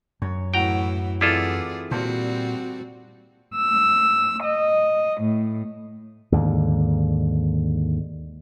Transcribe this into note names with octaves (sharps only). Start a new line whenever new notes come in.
F#2 C#5
A2 E3 E4 F#4 G5 A#5
E3 C4 E4 F4 G#4 A4 D5
A#2 G3 C4 F#4 C5 A5
E6
D#5
A2
D#2 G#2 D3